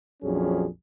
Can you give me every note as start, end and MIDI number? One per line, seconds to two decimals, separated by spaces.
0.23 0.67 34
0.23 0.67 41
0.23 0.67 54
0.23 0.67 61
0.23 0.67 62
0.23 0.67 68